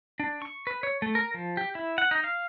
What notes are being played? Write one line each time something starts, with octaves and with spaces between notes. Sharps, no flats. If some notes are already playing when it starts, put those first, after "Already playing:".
D4
C#6
B4
C#5
A3
A#4
F3
G4
E4
F#5
D#4
F5